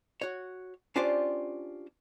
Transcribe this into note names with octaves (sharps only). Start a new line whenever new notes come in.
F#4 C#5
C#4 D4 F4 G4 C5 D5